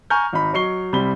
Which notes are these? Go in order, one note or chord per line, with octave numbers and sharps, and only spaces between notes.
G#5 A#5 C#6 F6 G6
G#1 D#4 B5
F#3 D#5 C#6 C7 G7
C2 G3 C4 B5 G7